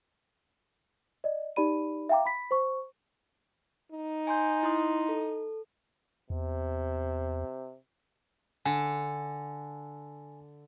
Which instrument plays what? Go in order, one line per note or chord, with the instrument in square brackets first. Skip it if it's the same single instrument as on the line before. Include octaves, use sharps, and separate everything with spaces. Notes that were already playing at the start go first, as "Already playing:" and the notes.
[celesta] D5 D#5
D#4 G4 D5 B5 D#7
E5 F5 G5 A#5 D6
B5 B6
C5 C#6
[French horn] D#4
[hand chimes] G#5 C6 G6
E4 C6 D#6
A4
[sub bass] E2 [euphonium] C3
[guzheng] D3 [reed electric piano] G#5